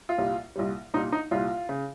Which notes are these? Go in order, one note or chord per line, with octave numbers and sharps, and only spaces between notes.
F4
C2 A#2 G3
C2 A#2 G3
C2 A#2 G3 D#4
D#4
C2 A#2 G3 F4
C#3